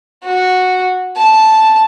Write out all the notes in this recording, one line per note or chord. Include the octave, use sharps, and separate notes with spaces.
F#4
A5